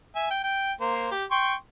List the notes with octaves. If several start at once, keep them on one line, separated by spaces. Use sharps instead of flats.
E5 G#5
G5
G5
A#3 C5
G4
G5 C6 C#6